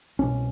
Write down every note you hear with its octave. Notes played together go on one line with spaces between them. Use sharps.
C2 B2 C#4